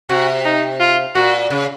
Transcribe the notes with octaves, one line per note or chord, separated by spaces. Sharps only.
C3 F#4
D#4
F4
A#2 F#4
C#3